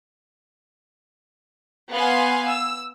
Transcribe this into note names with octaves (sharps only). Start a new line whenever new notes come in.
B3 F5 G#5 C6
E6